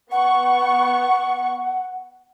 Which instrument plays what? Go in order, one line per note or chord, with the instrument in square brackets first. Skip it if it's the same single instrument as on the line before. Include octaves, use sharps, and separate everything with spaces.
[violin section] B3 C#6 [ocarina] F#5